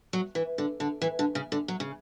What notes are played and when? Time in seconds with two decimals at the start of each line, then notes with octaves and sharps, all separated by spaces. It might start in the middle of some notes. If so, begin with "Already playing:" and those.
0.13 F#3
0.35 E3
0.58 D3
0.80 D3
1.02 E3
1.19 D3
1.35 C#3
1.52 D3
1.68 F#3
1.80 C#3